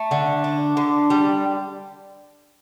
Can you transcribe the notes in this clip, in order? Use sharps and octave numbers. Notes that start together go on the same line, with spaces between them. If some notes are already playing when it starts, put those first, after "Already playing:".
Already playing: A3
D3
D4
D3
G3